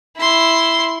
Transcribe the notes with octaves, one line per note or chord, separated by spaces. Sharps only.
E4 C6